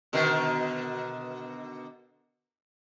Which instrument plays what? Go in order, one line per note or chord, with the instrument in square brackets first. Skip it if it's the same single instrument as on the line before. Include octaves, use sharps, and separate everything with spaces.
[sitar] B2 D3 D#3